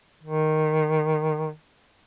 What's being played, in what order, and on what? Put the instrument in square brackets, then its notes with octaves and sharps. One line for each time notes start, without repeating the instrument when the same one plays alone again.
[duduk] D#3